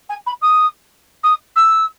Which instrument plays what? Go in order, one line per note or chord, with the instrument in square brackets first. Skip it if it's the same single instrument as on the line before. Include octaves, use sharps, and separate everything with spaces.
[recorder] G#5
B5
D#6
D#6
E6